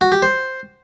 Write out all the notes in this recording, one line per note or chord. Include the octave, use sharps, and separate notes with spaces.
F#4
G4
C5